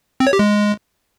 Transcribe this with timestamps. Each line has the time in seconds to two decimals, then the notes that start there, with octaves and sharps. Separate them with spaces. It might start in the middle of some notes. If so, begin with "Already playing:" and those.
0.20 C4
0.27 C#5
0.33 G4
0.39 G#3